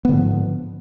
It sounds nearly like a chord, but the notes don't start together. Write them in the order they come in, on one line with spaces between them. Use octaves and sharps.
B3 D3 G#2 F3